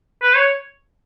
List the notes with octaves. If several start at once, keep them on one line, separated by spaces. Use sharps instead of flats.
B4
C#5